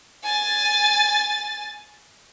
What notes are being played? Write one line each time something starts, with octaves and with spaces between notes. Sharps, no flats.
G#5 A6